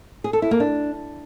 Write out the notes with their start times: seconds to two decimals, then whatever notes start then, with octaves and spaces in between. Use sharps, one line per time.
0.24 G#4
0.33 A4
0.42 E4
0.51 A#3
0.60 D4